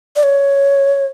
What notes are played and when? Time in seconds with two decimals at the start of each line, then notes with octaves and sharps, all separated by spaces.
0.16 D5
0.23 C#5